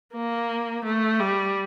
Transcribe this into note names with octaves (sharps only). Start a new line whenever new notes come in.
A#3
A3
G3